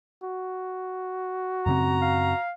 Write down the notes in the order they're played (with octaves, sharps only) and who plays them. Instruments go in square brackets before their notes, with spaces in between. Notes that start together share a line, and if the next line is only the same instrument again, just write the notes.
[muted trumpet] F#4
[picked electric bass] F#2 C#3 C4 [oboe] A#5
[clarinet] F5